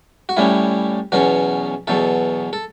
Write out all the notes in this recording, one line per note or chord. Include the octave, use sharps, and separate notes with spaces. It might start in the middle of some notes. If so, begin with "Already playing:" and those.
F#4
A2 G3 C#4 E4
E2 B2 F#3 C#4 F#4
E2 B2 F#3 A4
A4